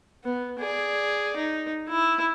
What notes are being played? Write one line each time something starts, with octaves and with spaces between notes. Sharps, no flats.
B3
G#4 D5
D#4
E4